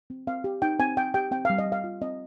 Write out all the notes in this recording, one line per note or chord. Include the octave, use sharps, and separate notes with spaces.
C4
C4 F5
G4
D#4 G5
C4 G#5
C4 G5
G4 G5
C4 G5
G3 F5
D#5
G3
F5
F4
C4 D#5